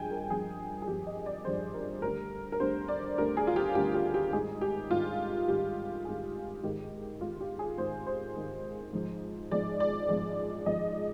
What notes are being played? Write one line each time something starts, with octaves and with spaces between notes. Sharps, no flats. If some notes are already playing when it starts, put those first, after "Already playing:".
Already playing: G2 F3 G#3 G5 G#5
A#4
G2 F3 G#3 G#4
G#4
G2 F3 G#3 G4
D#5
D5
G2 F3 G#3 C5
A#4
D2 D3 G3 A#4
A#4
D2 D3 G3 C5
D5
D2 D3 G3 A#4
G#4
F4
G4
D2 D3 G3 G4
G4
G4
G#2 D#3 G3 G#4
G4
G#2 D#3 G3 F4
G#2 D#3 G3 G4
G#2 D#3 G3 G#4
G#2 D#3 G#3 G4
G#2 D#3 G#3 F4
G4
G#4
G#2 D#3 G#3 C5
C5
G#2 D#3 G#3
G#2 F3 G#3
G#2 F3 G#3 D5
D5
G#2 F3 G#3
G#2 F3 G#3 D#5